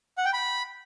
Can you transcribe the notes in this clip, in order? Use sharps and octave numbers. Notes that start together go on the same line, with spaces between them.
F#5
G5
B5